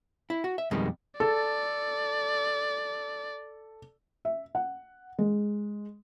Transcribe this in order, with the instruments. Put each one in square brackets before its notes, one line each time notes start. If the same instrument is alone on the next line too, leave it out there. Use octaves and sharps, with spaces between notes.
[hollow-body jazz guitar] E4
F#4
E5
F2 B2 D#3 G3 G#3
[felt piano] A4 [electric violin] D5
[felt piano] E5
F#5
G#3